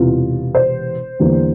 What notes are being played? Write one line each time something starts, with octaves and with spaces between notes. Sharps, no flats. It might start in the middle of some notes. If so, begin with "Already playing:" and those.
Already playing: E1 E2 C3 E3 F4
C5
E2 D3 G3 A#3